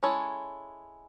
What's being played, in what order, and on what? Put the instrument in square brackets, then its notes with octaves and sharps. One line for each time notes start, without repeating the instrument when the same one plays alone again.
[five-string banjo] G#3 C#4 E4 A4 C#5